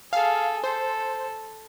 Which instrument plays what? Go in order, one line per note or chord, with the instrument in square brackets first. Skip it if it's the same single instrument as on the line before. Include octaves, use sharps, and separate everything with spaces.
[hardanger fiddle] G#4 A4 [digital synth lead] F5
[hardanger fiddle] A4 [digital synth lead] C5